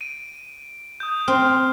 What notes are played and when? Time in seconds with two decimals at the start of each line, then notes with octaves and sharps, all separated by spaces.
0.01 D7 D#7
1.00 D#6 G6
1.28 C4 F6